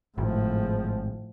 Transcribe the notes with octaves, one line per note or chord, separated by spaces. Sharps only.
G#1 A2 F3